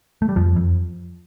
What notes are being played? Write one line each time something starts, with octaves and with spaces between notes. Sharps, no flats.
A3
G3
F2 F3
F2